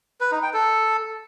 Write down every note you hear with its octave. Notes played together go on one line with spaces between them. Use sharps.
B4
D#4
G5
A4